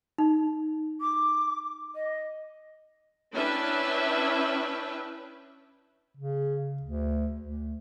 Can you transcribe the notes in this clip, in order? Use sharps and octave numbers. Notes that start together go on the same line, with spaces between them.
D#4
D6
D#5
C#4 D4 E4 B4 E5 G5
C#3
D2
D2